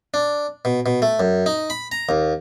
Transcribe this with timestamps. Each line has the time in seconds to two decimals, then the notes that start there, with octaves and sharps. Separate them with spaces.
0.14 D4
0.65 B2
0.86 B2
1.02 A3
1.20 F#2
1.46 D#4
1.70 B5
1.92 A#5
2.09 D#2